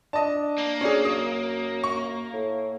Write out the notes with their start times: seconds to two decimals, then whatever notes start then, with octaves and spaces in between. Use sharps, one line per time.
0.13 D4 D#5 A5
0.58 A#3
0.81 C#4 D4 G#4
1.05 F#2 D#6
1.84 C#6
2.33 A2